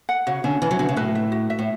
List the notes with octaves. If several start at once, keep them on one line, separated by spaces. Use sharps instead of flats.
F#5
C#3 F#4
D3 C#4
E3 C#4
F#3
D3 F#4
C#3
A2 B4
E5
F#4
E5
A2